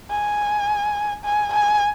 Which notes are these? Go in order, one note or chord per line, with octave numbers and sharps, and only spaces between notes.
G#5
G#5
G#5